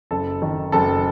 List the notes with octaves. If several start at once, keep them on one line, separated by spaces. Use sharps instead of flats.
F#1 A4
D#3
F#1 A4